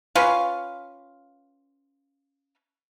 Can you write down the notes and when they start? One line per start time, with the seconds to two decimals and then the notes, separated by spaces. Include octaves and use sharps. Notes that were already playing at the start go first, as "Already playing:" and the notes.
0.15 C#4 F4 B4 F5